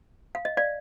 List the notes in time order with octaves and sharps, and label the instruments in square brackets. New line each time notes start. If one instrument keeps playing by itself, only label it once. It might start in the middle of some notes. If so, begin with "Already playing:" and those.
[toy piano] F5
D#5
D5 F5